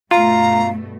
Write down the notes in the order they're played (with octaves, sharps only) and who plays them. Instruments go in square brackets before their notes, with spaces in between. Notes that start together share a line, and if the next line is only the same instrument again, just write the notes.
[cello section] G2 B2 A3 [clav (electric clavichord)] F4 [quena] F5 [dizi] A#5